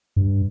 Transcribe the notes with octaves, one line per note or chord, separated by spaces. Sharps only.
G2